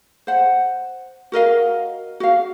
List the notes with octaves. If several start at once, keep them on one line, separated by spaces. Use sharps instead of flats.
C5 F#5
F#4 A#4 D#5 F5
F#4 F5